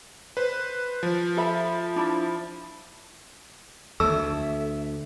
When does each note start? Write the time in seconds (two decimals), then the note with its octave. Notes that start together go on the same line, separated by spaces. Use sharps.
0.37 B4 C5
1.03 F3
1.37 A4 E5 B5
1.96 D4 E4 B5
4.00 D2 A4 E5 E6